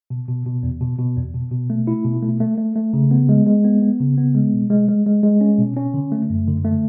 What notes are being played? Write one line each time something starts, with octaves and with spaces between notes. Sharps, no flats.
B2
B2
B2
E2
B2
B2
E2
B2
B2
A3
E4
B2
A3
A3
A3
A3
C#3
B3
G#3
G#3
B3
B3
C#3
B3
G#3
B2
G#3
G#3
G#3
G#3
C#4
B2
C#4
D3
A3
F#2
D3
A3